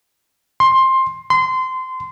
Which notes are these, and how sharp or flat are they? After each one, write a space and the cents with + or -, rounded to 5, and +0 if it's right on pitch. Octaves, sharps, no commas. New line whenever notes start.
C6 +15
C6 -20